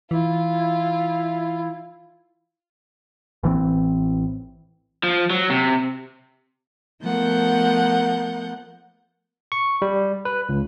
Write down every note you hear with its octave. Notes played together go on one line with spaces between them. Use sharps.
E3 E4 F4
A1 E3 A3 C4
F3
F#3
C3
F3 A3 B3 A#4 F#5 G6
C#6
G3
B4
C#2